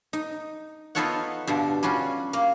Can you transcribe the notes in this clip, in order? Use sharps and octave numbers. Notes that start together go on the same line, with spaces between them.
D#4
B3 D#4 F4 A4 C#5 F#5
G2 B2 D3
G3 C#4 F4 F#4
A#3